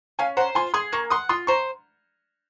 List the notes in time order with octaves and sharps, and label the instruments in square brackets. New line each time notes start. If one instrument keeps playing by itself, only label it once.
[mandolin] C#4 [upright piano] F5 G#5
[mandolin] C5 [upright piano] F#5 A#5
[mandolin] F4 [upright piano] G#5 C6
[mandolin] G#4 [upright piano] C6 D#6
[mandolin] A#3 [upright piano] A#5 C#6
[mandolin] F#5 [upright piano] C6 D#6
[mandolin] F4 [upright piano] C6 D#6
[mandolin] C5 [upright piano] A#5 C#6